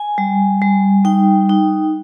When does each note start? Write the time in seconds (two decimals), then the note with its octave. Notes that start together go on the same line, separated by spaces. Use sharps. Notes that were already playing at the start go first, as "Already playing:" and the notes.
Already playing: G#5
0.18 G3
0.62 G3
1.05 D#4 G5
1.49 D#4